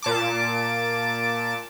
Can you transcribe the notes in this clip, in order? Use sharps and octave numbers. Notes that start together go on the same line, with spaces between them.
A#2 A5 D6